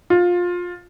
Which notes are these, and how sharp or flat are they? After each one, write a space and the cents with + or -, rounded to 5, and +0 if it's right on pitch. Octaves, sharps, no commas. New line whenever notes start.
F4 +20